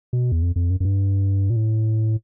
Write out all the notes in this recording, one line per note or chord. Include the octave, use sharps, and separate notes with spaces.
B2
E2
F2
F2
F#2
F#2
G2
A#2
A2